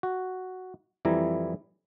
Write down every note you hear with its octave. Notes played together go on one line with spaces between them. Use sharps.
F#4
F2 E3 G3 E4 A#5